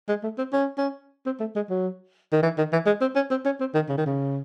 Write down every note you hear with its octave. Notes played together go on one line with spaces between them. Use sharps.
G#3
A3
C4
C#4
C#4
C4
A3
G#3
F#3
D#3
E3
D#3
E3
G#3
C4
C#4
C4
C#4
C4
D#3
C#3
D#3
C#3